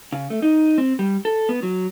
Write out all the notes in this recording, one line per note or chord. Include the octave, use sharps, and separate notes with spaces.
C#3
A3
D#4
C4
G3
A4
B3
F#3